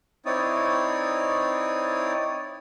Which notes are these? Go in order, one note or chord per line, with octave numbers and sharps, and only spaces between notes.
C4 D#4 E4 C#5 D5 D#6